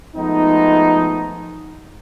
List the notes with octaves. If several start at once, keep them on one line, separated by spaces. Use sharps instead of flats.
F3 G#3 A3 B3 D#4